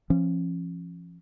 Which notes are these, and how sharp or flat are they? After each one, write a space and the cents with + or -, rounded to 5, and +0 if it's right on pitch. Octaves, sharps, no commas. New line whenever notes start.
F3 -30 C#4 -30